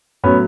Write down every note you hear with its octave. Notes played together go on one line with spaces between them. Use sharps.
A2 F#3 B3 C#4